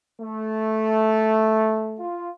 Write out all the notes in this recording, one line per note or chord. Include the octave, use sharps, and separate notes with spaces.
A3
F4